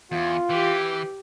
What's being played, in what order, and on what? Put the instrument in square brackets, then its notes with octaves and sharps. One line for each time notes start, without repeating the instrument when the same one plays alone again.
[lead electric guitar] E2 [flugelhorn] F4
[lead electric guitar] E3 [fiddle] G4